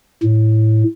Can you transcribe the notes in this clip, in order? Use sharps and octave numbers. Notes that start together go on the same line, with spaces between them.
A2